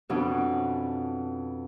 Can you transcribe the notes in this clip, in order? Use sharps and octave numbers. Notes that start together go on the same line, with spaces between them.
F2 B2 C#4 D4